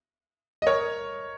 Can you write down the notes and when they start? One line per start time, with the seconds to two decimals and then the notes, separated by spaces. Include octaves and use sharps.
0.62 D#5
0.67 A#4 C#5